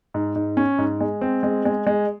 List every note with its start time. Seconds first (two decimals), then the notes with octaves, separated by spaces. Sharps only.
0.14 G#2
0.35 G#2
0.57 C#4
0.78 G#2
1.01 G#3
1.21 C4
1.43 G#3
1.65 G#3
1.87 G#3